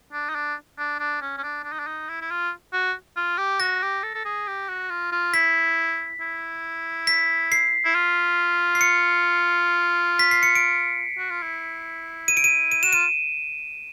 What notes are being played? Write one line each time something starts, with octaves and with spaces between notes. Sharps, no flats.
D4
D#4
D4
D4
D4
C#4
C#4
D4
D4
D#4
D4
D#4
E4
E4
F4
F#4
F4
G4
F#4 A#6
G4
A4
A4
G#4
G4
F#4
F4
F4
E4 B6
E4
B6
C7
E4
F4
C7
C#7
B6
C7
C#7
D7
F#4
F4
E4
D#7
D7
D#7
D#7
F#4 E7
F4 D#7